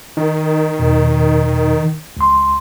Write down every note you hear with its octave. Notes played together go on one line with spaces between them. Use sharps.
D#3
E2 B2
C#2 C6